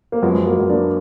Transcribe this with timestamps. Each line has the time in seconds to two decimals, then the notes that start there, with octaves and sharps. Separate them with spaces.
0.12 A#3
0.22 F#2 F3 G#3 B3
0.35 G#3
0.46 F#3 A#3
0.58 G#3 B3
0.69 A#3 D4